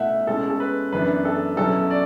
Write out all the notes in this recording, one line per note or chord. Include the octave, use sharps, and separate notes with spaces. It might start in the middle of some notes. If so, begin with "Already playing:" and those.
Already playing: B2 A3 E4 E5 F#5
B2 G#3 C#4 E4 A4
A4
B4
F#2 E3 B3 D4 B4
A4
B2 F#3 C#4 E4 A4
D5